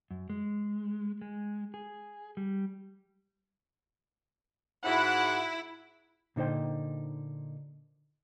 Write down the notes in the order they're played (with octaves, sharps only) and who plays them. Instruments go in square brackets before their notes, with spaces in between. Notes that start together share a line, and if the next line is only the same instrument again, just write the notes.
[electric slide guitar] F#2
G#3
G#3
G#4
G3
[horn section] G#2 F#4 F#5 [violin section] E4
[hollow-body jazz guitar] A#2 D3 D#4 C5 G5